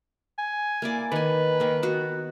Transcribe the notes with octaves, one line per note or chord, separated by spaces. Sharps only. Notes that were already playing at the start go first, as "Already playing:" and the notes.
G#5
A#3 E4 D5
D#3 B4 G#5
D#3 A#3
B3 F#4